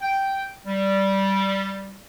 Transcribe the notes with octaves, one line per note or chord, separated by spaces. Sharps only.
G5
G3